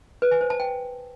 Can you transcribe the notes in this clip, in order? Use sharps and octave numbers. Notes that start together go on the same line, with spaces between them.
B4
G#5
C5
A5
G5